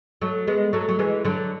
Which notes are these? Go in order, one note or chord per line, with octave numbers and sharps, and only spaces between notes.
F#3 A3
G#3 B3
F#3 A3
F#3
E3 G#3
D3 F#3